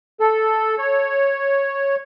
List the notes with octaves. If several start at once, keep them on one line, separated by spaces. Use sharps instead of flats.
A4
C#5